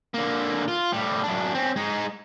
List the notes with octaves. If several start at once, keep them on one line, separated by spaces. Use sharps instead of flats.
D3 A#3
F4
A2 G3
F#2 D4
C4 C#4
G#3 D#4